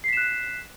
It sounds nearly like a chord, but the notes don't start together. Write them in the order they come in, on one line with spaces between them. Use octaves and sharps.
C7 B6 E7 F#6